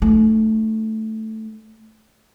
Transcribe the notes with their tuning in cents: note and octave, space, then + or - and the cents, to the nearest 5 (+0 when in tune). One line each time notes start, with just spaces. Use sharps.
A3 +0 D#4 -40